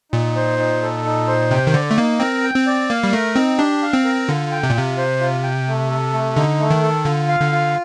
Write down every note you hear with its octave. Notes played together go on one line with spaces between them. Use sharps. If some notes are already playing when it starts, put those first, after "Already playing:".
A#2 D#4
C5
D#4
A4
D#4
C5
C3 G5
D#3
D3 D5
A3
A#3 D#4
C4 A#4
G5
C4
D5
A#3 F5
G3
A3 A#4
C4 D#4
D4 G4
F5
C4
A#4
D3 F4
G5
C3
A#2
C3 F4
C5
F4
G5
A3
A4
A3
D3 D#4
A3
D#3
A4
D3 F4
F5
D3
F4